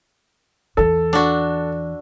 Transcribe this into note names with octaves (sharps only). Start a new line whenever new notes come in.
E2 E3 A4
D4 F#4